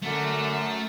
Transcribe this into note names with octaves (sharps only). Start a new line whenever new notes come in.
F#2 D3 A3